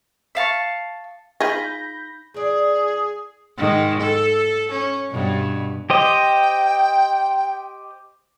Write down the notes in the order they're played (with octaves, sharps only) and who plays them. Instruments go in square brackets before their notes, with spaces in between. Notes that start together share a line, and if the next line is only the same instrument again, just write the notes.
[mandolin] E5 F5 A5 C#6
[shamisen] D#4 F4 G#4 [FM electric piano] B5 G6 A#6
[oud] E2 D5 [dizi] G#4
[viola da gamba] G#2 D#3
A4
C#4
G2 B2
[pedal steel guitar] G4 C5 D#5 [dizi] G5